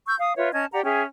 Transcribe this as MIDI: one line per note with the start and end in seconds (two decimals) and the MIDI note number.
0.07 0.15 85
0.07 0.15 88
0.07 0.15 91
0.19 0.35 77
0.19 0.35 87
0.37 0.51 65
0.37 0.51 71
0.37 0.51 73
0.37 0.51 76
0.53 0.65 61
0.53 0.65 75
0.53 0.65 81
0.53 0.65 92
0.72 0.84 67
0.72 0.84 74
0.72 0.84 78
0.72 0.84 82
0.84 1.03 61
0.84 1.03 68
0.84 1.03 76
0.84 1.03 79